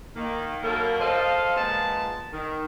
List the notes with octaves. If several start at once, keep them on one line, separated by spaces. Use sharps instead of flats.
D#3 A#3
B2 F#3 A#3 A4 A#4
A4 C5 D#5 F5
A#2 G#3 B3 A5
D#3